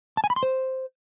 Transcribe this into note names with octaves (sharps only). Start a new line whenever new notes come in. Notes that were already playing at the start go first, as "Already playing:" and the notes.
A5
G#5
B5
C6
C5